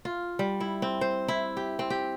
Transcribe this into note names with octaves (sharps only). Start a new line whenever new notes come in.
F4
G3
E4
C4
C5
E4
G4
C4
G4